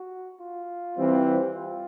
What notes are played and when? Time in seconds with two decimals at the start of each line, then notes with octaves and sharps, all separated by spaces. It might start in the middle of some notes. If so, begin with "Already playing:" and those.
Already playing: F#4
0.40 F4
0.98 E3 G3 C4
1.55 F4